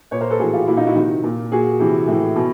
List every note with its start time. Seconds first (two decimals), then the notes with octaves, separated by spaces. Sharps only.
0.11 A#2 B4 C#5
0.21 A#4 C5
0.30 A4 B4
0.39 A2 E3 F#4 G#4
0.53 F4 G4
0.68 A#2 E4 F#4
0.77 D#4 F4
0.87 E4 F#4
0.95 C3 D#3
1.23 A#2
1.52 A#2 F#4 G#4
1.79 C3 E3
2.08 A2 E3
2.36 B2